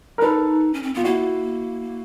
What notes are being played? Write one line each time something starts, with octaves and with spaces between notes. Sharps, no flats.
A#4
D#4 A4 B4
C#4
C4
B3 F4
A#3 E4 F#4